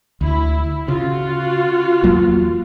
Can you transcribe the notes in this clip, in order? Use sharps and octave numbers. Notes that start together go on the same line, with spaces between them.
D2 E4
C#3 F4 F#4
E2 F#3 A#3